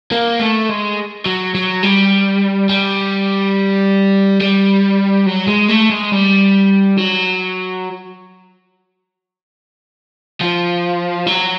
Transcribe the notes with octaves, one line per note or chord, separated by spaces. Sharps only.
A#3
A3
G#3
F#3
F#3
G3
G3
G3
F#3
G#3
A3
G#3
G3
F#3
F3
F#3